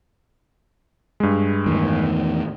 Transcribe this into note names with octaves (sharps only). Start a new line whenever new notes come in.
G2 G#3
E2 A2 D#3